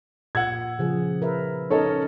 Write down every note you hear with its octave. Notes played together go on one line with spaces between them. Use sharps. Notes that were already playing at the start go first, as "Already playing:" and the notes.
A#2 F#5 E6 G#6
C#3 F3 G#4
A#4 B4 E5
C#4 D#4 A4 A#4 C#5 D#5